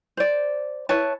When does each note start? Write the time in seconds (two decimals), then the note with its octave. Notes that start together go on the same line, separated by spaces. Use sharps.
0.17 C5 D5
0.89 E4 B4 C#5 A5